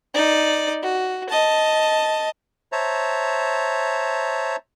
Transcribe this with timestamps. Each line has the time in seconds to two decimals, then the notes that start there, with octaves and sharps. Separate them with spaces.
0.14 D#4 D5
0.83 F#4
1.29 D#5 A5
2.72 C5 C#5 E5 A5 A#5